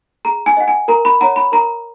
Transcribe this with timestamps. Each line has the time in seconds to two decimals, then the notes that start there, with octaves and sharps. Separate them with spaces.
0.25 G#4 A#5
0.46 G#5
0.57 D#5 F#5
0.68 G#5
0.88 A#4 A#5
1.05 B5
1.21 C#5 F#5 A#5
1.36 B5
1.52 A#4 A#5